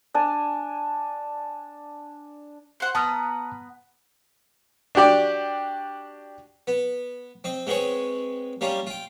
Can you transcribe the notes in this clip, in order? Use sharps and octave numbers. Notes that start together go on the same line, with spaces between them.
D4 D5 G#5
C5 F#5
B3 B4 A5 A#5 D#6 F6
D4 F#4 G4 D5
B3
C4 D#5
G#3 B3 C4 G#4 C#5
G3 A#3 C#4 F4
F4 G5